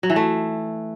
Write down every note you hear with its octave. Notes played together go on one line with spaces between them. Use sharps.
F#3
E3
A3